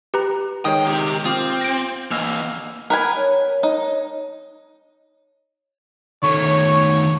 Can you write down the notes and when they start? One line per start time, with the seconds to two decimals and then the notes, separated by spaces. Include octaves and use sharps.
0.14 G4 B4 A#5
0.65 D#3 G#3 D#4 C#5 G5 D#6
0.87 C3 G4
1.25 C4 F4 D6 D#6 F6
1.61 A#6 D7
2.11 E3 A#3 D#5 E6 F6
2.90 A#4 B4 G#5
3.17 C#5
3.63 D#4
6.23 D#3 A3 C#5 C#6